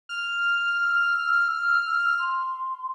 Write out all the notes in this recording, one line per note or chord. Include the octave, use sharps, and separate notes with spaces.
F6
E6
C6